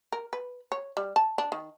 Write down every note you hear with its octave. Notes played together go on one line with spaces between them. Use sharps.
A#4
B4
C#5
G3
A5
D4
D#3